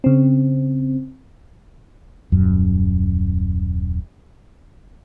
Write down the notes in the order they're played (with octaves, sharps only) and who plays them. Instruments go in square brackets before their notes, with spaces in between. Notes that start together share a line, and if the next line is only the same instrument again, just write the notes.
[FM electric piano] C#3 C4
[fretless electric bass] D#1 F#2